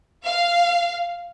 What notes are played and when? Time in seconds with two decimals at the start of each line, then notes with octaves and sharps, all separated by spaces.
0.24 F5